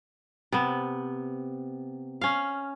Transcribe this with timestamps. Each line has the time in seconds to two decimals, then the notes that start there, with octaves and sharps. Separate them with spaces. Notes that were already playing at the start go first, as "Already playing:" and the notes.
0.52 C3 B3
2.21 C#4 F5